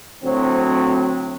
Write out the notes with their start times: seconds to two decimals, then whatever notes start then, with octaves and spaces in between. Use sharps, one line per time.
0.24 D2 A2 F#3 C4